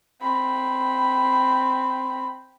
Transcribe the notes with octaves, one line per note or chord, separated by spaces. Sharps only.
C4 B5